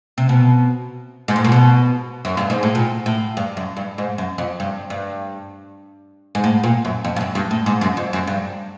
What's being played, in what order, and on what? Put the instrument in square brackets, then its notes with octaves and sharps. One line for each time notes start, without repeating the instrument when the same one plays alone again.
[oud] C3
B2
G#2
A2
A#2
B2
F#2
G2
G#2
A2
A#2
A2
G2
F#2
G2
G#2
F#2
F2
G2
G2
G#2
A2
A#2
F#2
F2
G2
F#2
G2
A2
G#2
F#2
F2
F#2
G2